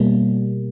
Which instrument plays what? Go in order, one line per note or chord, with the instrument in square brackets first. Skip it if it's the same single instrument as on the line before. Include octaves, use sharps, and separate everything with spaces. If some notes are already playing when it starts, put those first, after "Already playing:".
Already playing: [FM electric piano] B2 G3 A#3